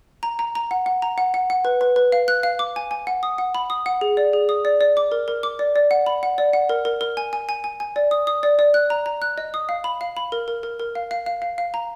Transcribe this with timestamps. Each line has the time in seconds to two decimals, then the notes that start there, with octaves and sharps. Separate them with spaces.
0.23 A#5
0.39 A#5
0.55 A#5
0.71 F#5
0.86 F#5
1.02 A#5
1.18 F#5
1.34 F#5
1.50 F#5
1.65 B4
1.81 B4
1.96 B4
2.12 F5
2.28 F#6
2.43 F5
2.59 D6
2.76 G#5
2.91 G#5
3.07 F#5
3.23 D#6
3.38 F#5
3.55 B5
3.70 D#6
3.86 F#5
4.01 G#4
4.17 D5
4.33 G#4
4.49 D#6
4.65 D5
4.81 D5
4.97 D6
5.12 A#4
5.28 A#4
5.43 D6
5.59 D5
5.76 D5
5.91 F#5
6.06 B5
6.23 F#5
6.38 D5
6.53 F#5
6.69 A#4
6.85 A#4
7.01 A#4
7.17 G#5
7.33 G#5
7.49 G#5
7.64 G#5
7.80 G#5
7.96 D5
8.11 D#6
8.27 D#6
8.43 D5
8.59 D5
8.74 F#6
8.90 A#5
9.06 A#5
9.22 F#6
9.38 D#5
9.54 D#6
9.69 F5
9.84 B5
10.01 F5
10.17 B5
10.32 A#4
10.48 A#4
10.63 A#4
10.79 A#4
10.95 F5
11.11 F5
11.26 F5
11.42 F5
11.58 F5
11.74 A#5